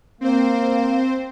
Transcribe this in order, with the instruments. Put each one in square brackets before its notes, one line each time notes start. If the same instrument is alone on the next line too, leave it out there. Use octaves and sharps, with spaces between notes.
[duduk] A#3 [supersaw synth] C4 C5